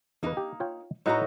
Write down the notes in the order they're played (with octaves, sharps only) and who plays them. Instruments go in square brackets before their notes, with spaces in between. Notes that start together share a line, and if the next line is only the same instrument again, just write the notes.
[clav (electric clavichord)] E2 B4 [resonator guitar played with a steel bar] A#3 D#4
[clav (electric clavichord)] G4
F4 C#5 G5
[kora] A2 D#4 F#4 [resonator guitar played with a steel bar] A4 B4 A#5 [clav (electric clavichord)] C#5 D#5